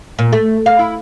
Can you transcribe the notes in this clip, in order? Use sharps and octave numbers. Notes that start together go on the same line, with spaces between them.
A#2
A3
F5
E4